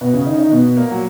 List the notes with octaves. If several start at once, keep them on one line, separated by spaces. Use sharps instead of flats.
B2 B3
C#3 C#4
D#3 D#4
C#4
D#3 D#4
B2 B3
A#2 A#3
F#3